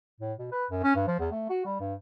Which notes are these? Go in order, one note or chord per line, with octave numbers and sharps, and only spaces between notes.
A2
B2
B4
F#2
C#4
G2
F3
E2
A3
F#4
G3
G2